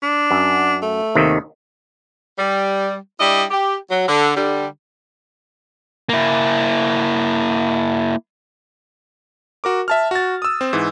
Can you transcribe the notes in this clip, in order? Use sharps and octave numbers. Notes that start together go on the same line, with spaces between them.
D4
F#2
A3
D#2 C3 D#3
G3
G3 D4 E4 D#5
G4
F#3
D3
D3 G3
A#3 E4
F#4 A#4 D6
E5 A5 F6
F#4 A6
D#6 E6
C4
G#2 E3